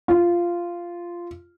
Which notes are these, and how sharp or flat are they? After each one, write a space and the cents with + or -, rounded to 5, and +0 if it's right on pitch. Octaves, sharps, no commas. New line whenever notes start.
F4 -10